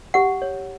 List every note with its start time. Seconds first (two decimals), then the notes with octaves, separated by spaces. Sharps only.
0.14 G4 F#5
0.42 C#5